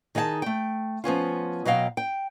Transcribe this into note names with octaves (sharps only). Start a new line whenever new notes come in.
D#3 D#4 G#4 F5 A5
A3 G5
F3 B3 C#4 F4
B2 F#3 D#5 F5 G5
G5